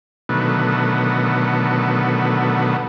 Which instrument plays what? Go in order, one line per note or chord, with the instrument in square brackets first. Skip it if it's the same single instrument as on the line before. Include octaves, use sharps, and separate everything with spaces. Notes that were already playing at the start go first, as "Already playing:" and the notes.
[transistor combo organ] B2 D3 D#3 F#3 A3 B3